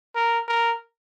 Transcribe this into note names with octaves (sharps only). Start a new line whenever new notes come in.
A#4
A#4